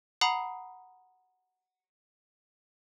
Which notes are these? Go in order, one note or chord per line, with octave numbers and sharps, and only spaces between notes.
F#5 A#5 B5 D#6 C7